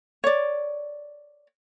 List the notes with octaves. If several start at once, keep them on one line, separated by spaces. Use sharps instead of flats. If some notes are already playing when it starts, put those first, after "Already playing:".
C#5 D5